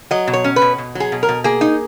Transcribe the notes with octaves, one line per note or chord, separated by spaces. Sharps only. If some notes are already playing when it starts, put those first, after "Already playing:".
F#3 D#5
B2
C#5
C#4
B4
B2
B2
F#3 G#4
B2
A#4
B2
A#3 G#4
D#4